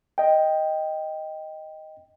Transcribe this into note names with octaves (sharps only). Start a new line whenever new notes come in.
D#5 G5